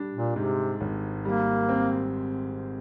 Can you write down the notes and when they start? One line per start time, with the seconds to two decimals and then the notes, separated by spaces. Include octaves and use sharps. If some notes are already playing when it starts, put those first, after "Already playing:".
Already playing: G3 D4
0.15 A#2
0.36 G#2 C3
0.80 G#1
1.25 G3 A#3
1.69 C4